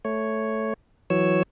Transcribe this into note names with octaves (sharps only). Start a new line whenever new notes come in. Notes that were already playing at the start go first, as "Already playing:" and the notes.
A3 C#5
E3 F#3 C#5 E6